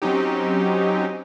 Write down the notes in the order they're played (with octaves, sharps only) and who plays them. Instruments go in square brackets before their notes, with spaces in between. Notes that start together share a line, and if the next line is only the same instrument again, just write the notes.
[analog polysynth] F#3 C4 C#4 D#4 G4